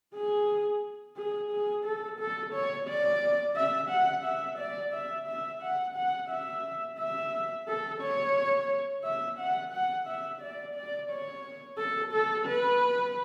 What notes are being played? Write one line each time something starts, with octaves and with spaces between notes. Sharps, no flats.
G#4
G#4
G#4
A4
A4
C#5
D5
E5
F#5
E5
D5
E5
E5
F#5
F#5
E5
E5
A4
C#5
E5
F#5
F#5
E5
D5
D5
C#5
A4
A4
B4